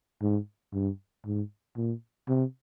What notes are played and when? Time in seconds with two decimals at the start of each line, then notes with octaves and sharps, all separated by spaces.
0.22 G#2
0.73 G2
1.26 G#2
1.77 A#2
2.28 C3